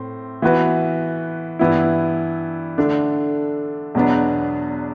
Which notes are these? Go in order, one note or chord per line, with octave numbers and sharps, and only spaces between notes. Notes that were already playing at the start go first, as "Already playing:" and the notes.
Already playing: A2 C4
E3 B3 F#4 B4
G2 E3 B3 E4
D3 A3 D4
E2 B2 F#3 B3 D4